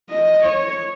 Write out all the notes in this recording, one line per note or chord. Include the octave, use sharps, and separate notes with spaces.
D#5
C#5